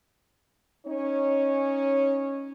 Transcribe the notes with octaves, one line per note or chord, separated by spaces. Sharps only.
C#4 D#4 C#5